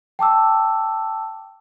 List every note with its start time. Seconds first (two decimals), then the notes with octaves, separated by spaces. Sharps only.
0.19 G5 A5 D6 E6